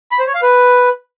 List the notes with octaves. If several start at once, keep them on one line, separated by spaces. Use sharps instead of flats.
B5
C5
C#5
F5
B4